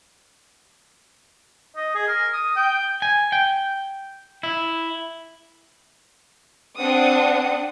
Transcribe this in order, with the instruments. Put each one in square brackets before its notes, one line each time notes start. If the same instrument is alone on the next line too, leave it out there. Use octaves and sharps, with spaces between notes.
[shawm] D#5
G#4
A#4
D#6
G5
[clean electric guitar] G#5
G5
E4
[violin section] C4 D4 F#5 D#6